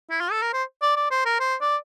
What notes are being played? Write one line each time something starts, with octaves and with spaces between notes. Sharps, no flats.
E4
F4
A4
A#4
C5
D5
D5
C5
A#4
C5
D5